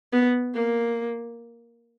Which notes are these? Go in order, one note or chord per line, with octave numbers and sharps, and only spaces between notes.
B3
A#3